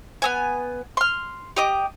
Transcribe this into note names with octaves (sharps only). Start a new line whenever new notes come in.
B3 C4 G#5
C6 F6
G4 D#5 D6